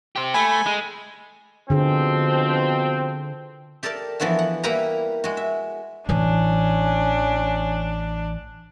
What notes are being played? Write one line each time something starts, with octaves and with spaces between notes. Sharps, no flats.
G4 C5
A3 G#5 B5
B5
G#3
B2 D3 F3 C4 G#4
G4 A4 A#4 D5 A5
E3 F3 B3 F#4 E5
F#5
G3 A#3 E4 G4 B4 A#5
G#3 F#4
E5
A1 E3 C#4 D4